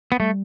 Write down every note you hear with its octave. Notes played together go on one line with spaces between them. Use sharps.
B3
G3 A3